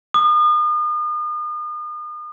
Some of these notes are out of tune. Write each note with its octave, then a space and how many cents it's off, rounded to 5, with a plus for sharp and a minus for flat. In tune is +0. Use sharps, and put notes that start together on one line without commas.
D#6 -40